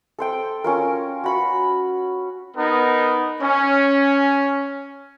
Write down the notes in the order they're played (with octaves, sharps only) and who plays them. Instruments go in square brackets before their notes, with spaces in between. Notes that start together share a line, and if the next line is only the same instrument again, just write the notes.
[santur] A4 C5 G5
C#4 F4 A#4
F#4 B5 C#6
[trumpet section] B3 D#4 A#4
C#4